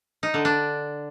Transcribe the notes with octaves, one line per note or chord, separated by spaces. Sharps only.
D#4
D3
D4